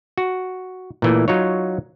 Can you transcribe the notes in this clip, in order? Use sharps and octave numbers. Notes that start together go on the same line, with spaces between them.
F#4
A#2 E3 A3
F#3 D#4 F4 C#5